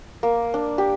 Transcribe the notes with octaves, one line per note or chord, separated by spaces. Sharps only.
A#3
D4
G4